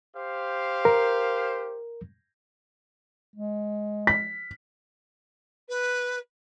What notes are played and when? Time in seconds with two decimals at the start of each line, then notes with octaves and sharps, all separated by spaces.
0.15 G4 C5 F5
0.85 A#4
3.35 G#3
4.07 B6
5.69 B4